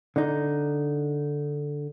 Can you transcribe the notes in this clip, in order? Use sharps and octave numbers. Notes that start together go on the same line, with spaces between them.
D3 D#4